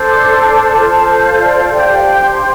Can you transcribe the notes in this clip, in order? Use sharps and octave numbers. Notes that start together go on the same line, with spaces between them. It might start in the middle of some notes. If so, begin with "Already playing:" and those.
Already playing: D4 A4 C5
D6
C6
A5
F4 A4 C5
F5
D5
F5
D4 G4 C5 D5
G5
F5
F5
G5
C6